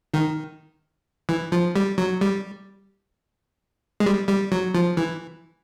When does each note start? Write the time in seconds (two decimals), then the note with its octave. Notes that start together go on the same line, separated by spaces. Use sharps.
0.14 D#3
1.29 E3
1.52 F3
1.76 G3
1.98 F#3
2.21 G3
4.00 G#3
4.06 G3
4.28 G3
4.52 F#3
4.74 F3
4.97 E3